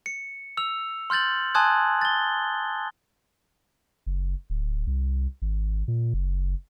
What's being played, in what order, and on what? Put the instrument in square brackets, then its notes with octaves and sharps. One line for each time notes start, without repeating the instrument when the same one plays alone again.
[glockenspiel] C#7
E6 F7
C6 F6 G6 A6 F#7
G#5 A5 C6 D#6 F#6 G#6
A6 G7
[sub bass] F#1
D1
C2
G#1
A#2
F#1